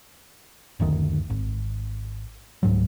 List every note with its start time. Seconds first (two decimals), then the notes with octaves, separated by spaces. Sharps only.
0.80 F#1 D2 D#3
1.30 G#1
2.63 C#2 G#2 F#3